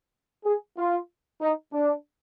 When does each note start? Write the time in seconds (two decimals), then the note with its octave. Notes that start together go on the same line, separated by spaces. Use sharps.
0.45 G#4
0.77 F4
1.41 D#4
1.73 D4